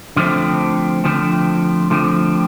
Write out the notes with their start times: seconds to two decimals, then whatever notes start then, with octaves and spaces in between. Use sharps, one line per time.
0.16 D3 F3 A3 C4
1.04 D3 F3 A3 C4
1.90 D3 F3 A3 C4